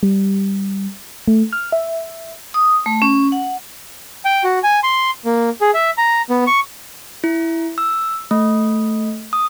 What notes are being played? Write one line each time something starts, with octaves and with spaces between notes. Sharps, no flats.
G3
A3
F6
E5
D#6
A3
C#4
F#5
G5
F#4
G#5
C6
A#3
G#4
E5
A#5
B3
C#6
E4
E6
A3
D#6